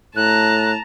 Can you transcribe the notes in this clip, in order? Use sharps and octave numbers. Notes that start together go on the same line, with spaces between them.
A2 A5 A#5 F#6